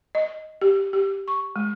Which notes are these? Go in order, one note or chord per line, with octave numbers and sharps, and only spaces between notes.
D#5
G4
G4
C#6
G#3